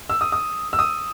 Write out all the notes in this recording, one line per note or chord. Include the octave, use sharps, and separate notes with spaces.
E6
D#6
D#6
E6
D#6